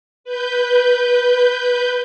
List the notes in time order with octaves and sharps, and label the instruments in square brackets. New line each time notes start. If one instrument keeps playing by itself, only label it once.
[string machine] B4 G6